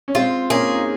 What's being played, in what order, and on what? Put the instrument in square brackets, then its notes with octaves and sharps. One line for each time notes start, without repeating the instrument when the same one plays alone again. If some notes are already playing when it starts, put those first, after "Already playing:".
[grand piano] C#4
[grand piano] G#3 C4 [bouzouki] F4
[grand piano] A#3 C#4 [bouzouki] G#4
[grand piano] D#4